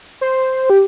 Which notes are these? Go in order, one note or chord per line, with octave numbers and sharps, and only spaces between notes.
C5
G4